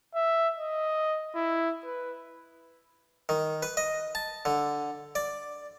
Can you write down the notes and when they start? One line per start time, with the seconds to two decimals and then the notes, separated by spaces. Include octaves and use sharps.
0.15 E5
0.58 D#5
1.35 E4
1.84 B4
3.29 D#3
3.63 B4
3.77 D#5
4.15 A5
4.45 D3
5.15 D5